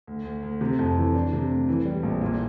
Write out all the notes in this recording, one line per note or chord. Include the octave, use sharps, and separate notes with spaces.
D2
D2
D2
C3
F2
E3
D4
C3
D2
E3
G3
A#1
A#2